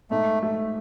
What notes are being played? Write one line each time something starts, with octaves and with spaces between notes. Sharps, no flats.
G#2 A3
A3